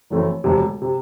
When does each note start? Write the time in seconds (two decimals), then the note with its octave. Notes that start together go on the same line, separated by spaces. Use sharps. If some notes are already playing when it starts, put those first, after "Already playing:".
0.10 F#1 F#2 E3 A3 C4
0.44 E1 D2 C3
0.82 C3